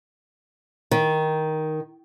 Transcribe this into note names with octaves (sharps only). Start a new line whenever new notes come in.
D#3